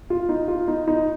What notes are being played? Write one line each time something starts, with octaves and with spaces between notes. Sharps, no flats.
F4
D#4
F4
D#4
D#4